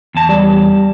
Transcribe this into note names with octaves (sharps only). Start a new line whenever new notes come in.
E2 A5
G3